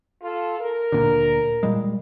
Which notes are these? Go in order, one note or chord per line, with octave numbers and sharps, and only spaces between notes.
F4 A4
A#4
D2 A#2 D3
A#2 G3 G#3